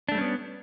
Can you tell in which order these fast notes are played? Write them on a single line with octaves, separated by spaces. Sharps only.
D4 A3 G3 C#4 B3